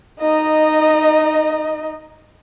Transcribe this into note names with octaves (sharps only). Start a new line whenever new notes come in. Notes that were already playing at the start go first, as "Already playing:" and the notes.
D#4 D#5